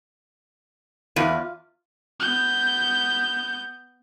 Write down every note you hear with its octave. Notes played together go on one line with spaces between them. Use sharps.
E2 F4 B4
B3 G6